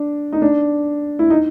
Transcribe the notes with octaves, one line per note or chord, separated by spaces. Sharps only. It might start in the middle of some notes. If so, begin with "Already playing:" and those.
Already playing: D4
D#4
D4
E4
D#4